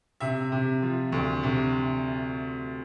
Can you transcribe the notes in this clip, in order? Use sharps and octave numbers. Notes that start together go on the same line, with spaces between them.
C3 E5
C3
F3
D2
C3